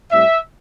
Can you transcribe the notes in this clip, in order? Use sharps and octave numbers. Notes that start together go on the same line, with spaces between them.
A2 G3 C4 E5